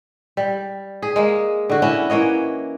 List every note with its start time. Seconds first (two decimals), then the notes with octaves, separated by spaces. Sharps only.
0.37 G3
1.02 G#4
1.16 G#3 A#3
1.70 D3 F#4
1.82 C#4 E4 F#4
2.10 E3 A#3 C#5 D#5